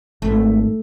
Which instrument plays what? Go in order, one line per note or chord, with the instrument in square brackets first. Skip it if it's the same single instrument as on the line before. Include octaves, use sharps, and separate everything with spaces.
[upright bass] G#1 [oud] A3